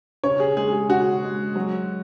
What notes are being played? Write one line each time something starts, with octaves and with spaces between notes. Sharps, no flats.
C#3 C#5
G#4
G#3 G#4
G#4
C#3 F#4
G#3
F#3